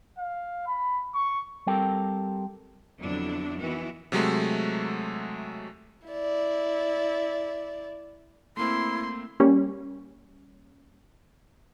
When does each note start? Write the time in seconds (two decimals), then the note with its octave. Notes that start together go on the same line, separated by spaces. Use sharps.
0.19 F5
0.67 B5
1.15 C#6
1.67 G3 C4 G4 A4 A#4 G5
2.98 F2 D3 F#3 B3 D4 E4
3.59 D#3 E3 B3 E4 F#4
4.12 C3 F#3 G#3 A3
6.07 E4 D5
8.57 A3 A#3 C4 E4 C6
9.40 G3 A#3 C#4